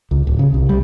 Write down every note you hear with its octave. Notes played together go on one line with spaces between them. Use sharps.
C#2
D1
C#3
C2
G3